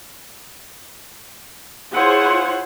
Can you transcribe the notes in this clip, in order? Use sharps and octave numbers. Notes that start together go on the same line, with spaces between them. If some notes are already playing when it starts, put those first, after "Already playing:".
E4 F4 G#4 C5 C#5 F#5